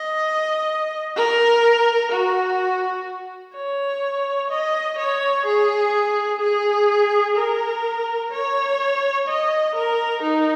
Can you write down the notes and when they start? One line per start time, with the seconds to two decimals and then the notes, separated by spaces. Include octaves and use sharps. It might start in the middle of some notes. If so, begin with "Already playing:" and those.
Already playing: D#5
1.17 A#4
2.12 F#4
3.55 C#5
4.50 D#5
4.98 C#5
5.46 G#4
6.41 G#4
7.36 A#4
8.32 C#5
9.27 D#5
9.75 A#4
10.22 D#4